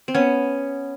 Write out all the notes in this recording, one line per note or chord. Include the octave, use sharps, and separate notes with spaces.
C4
B3 C#4